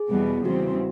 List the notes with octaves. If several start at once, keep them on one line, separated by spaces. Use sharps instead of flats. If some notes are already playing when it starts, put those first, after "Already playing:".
Already playing: G#4
E2 B2 G3 B3
E2 C#3 E3 G3 C4 F#4